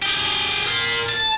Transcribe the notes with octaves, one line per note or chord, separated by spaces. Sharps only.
G4 G#4
A#4 C6
A5